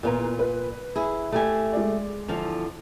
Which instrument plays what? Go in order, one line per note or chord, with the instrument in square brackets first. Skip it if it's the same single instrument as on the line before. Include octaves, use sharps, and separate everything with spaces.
[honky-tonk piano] E2 B4 A#5 [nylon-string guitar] A#2 F4
[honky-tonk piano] B4
[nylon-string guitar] E4 G#4
A3 G4 G#5
[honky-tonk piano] G#3 D5
[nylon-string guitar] E2 D3 F3 [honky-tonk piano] F7